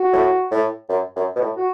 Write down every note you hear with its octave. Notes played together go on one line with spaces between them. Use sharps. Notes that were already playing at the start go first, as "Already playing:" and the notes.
Already playing: F#4
A2
A2
F#2
F#2
B2
A2
F#4